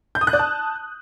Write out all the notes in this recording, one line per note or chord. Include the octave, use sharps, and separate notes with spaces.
G6
D#6
F#6
D5
A5